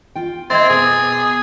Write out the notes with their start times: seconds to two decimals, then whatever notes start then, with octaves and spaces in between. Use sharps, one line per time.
0.15 F4 G5
0.50 A#3 C4 D#5 E5 G#6 A6
0.70 B2 G#4